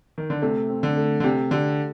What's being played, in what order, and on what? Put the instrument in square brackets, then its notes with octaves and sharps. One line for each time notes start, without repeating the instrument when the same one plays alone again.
[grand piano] D#3
D3
[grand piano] C3 [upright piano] A3
[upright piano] C4
[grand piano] D3
[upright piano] A3
[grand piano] D3
[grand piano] C3 [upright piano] G4
[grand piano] D3 [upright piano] G4